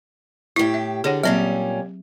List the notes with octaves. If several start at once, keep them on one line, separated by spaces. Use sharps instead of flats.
A2 E4 G4
E5
D3 G#4 C#5 F#5
A#2 F#3 G3 C4 C#4